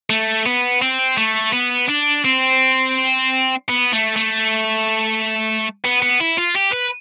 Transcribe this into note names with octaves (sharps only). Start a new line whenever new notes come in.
A3
B3
C4
A3
B3
D4
C4
B3
A3
A3
B3
B3
E4
F4
G4
B4